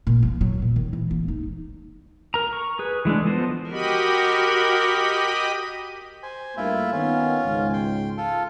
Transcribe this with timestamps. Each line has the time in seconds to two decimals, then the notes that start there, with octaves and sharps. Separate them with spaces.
0.07 A#2
0.23 F3
0.41 F#3
0.62 A#2
0.76 D#3
0.93 E3
1.11 A#3
1.28 D#4
2.34 A#4 A#5
2.53 C#6
2.79 G#4 B4
3.05 E3 G#3 A3 D4
3.25 F3 B3 A4 C5 D#5
3.71 F#4 G4 A#4 D#5 B5
6.23 C5 G#5
6.57 G2 A3 A#3 E4 F4 E5
6.92 D#3 B3 C#4 F4
7.45 C#2 G#2
7.73 G5 C6
8.17 F4 A4